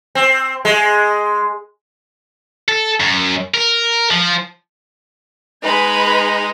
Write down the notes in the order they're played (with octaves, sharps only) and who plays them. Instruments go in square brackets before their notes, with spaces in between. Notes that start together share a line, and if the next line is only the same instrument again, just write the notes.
[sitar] C4
G#3
[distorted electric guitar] A4
F#2
A#4
F3
[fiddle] G#3 D#4 [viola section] B4 G#5 B5